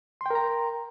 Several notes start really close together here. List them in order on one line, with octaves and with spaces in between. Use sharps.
C6 G5 A#4 A#5